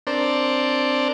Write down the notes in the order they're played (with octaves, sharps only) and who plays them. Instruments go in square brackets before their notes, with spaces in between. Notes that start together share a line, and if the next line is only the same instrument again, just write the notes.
[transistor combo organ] C4 D4 A#4 C5 D5 A5